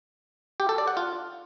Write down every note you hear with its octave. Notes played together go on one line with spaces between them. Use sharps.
G4
A4
D5
F#5
F4